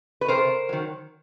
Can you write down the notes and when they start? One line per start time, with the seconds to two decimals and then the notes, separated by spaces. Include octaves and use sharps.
0.21 B4
0.28 C3 A#4 C5
0.69 D#3 F#3